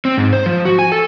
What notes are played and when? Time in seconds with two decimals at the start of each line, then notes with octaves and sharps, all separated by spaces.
0.05 C4
0.18 G#2
0.33 C5
0.46 F3
0.65 F#4
0.79 G#5
0.92 A4